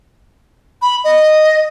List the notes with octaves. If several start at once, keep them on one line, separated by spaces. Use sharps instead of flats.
B5
D#5